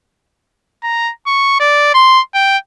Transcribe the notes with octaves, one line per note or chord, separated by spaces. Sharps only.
A#5
C#6
D5
C6
G5